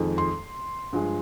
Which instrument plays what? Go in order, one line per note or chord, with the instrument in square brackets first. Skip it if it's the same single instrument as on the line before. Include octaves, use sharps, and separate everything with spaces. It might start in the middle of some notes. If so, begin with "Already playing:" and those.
Already playing: [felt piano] F2 D#3 G#3
C6
G2 F3 G#3